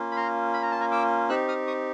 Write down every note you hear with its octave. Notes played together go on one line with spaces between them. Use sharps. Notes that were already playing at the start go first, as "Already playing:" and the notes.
Already playing: A#3 C#4 F4
B5
A#5 C6
B5
A#5
A5
G#5 A#5
D6 E6
C4 D#4 G4 E6 F#6
D#6 F6
C#6 D#6